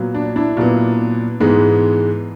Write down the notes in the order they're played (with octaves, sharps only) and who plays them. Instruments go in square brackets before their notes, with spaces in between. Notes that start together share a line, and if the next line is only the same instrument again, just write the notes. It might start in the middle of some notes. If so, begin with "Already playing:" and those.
Already playing: [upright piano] A#2 F#3 B3
D4
D4 E4
A#2 F#3 B3
G#2 E3 G#3 B3